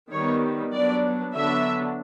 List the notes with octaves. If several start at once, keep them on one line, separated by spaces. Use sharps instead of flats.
D#3 G3 B3 C#5
F#3 B3 D4 D5
D3 F#3 B3 D4 E5